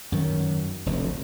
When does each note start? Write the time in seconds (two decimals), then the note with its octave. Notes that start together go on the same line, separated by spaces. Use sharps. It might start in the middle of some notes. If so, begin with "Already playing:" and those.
0.12 F#2 D#3 F#3
0.86 F1 D2